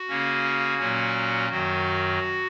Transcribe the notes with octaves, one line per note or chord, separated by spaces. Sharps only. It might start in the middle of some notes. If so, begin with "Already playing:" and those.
Already playing: F#4
C#3 A#3 C#4
A#2 F#3 A#3 C#4
F#2 D#3 F#3 F#4